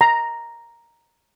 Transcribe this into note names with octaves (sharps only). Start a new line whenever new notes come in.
A#5